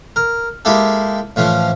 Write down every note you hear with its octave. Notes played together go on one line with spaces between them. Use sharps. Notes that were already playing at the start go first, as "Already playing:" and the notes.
A#4
G#3 A#3 E4 G4 A4
A2 E3 F3 C#4